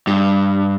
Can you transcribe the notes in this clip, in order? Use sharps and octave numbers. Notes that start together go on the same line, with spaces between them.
G2